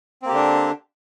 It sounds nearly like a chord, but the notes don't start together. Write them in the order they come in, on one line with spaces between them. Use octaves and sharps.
C4 A#3 G4 D3 D4